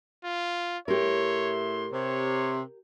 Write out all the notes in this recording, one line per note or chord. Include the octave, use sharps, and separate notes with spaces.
F4
A2 G4 A#4 C#5 E5 C6
C3 C#5